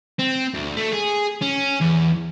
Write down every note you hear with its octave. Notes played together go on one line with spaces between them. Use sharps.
C4
D2
A3
G#4
C#4
E2